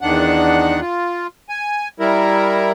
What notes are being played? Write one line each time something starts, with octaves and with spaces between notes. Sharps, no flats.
E2 D#3 D4 F#5
F4
G#5
G3 E4 A#4